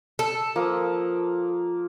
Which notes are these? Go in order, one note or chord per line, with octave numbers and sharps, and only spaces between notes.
A4
F3 A#3 D#6